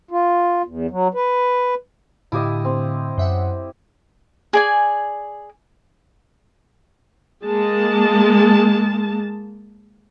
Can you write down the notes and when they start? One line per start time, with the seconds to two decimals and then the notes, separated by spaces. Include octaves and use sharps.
0.11 F4
0.66 E2
0.91 F#3
1.14 B4
2.32 A2 D3 E4 G4 D#5 F5
2.65 C4
3.18 F#2 E5 F#5
4.53 G#4 D5 G#5
7.45 G#3 A#3 A5